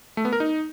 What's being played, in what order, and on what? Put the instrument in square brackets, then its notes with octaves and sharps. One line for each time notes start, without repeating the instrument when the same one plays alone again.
[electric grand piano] A3
B3
A#4
D#4